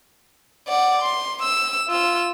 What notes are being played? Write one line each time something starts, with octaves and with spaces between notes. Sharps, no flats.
D5 F#5
C6
E6
F4 E6